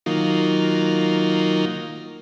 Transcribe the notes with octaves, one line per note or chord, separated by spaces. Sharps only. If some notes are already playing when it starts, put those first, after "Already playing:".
D#3 F#3 A#3 D#4 F4